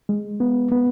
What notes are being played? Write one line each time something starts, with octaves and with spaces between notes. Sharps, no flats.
G#3
B3
B3